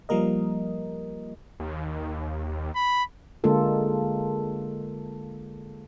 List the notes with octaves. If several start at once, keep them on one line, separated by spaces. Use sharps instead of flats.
F3 G3 A#3 A#4 D#5
D#2
B5
D3 G#3 A#3 F4 A4